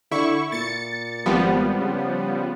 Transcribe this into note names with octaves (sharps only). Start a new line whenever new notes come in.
D3 E4 C#6
A#2 A6 C#7
G#1 F3 G3 B3
C#3